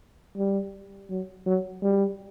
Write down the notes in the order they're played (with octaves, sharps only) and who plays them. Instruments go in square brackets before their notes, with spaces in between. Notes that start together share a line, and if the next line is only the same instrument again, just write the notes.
[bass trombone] G3
F#3
F#3
G3